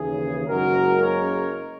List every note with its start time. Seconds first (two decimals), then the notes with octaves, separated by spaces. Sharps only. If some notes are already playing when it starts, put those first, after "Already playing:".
Already playing: D#2 C#3 E3 G#4
0.46 F#1 F#2 C#3 G#3 F#4 A#4
1.01 A#4 C#5